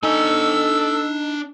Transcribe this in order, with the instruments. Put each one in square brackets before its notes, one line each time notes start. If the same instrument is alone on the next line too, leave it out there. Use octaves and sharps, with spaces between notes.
[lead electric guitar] D4 G#5 [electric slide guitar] D#4 [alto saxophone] A4 [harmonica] E6